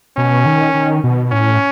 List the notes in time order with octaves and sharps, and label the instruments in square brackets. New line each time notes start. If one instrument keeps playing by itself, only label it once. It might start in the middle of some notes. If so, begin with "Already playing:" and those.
[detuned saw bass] B2 [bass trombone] C#4
[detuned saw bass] D#3
D#3
B2
[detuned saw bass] A2 [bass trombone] C#4